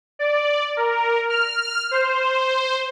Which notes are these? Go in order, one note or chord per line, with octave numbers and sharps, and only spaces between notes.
D5
A#4
F6
C5